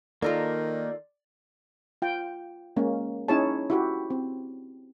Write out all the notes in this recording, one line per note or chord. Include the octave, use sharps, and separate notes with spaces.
D#3 A#3 D#4 F4 A4 A#4 D5
F4 G5
G#3 A#3 C#4
C#4 D#4 E4 G#4 C#5 A5
E4 F#4 G4
C4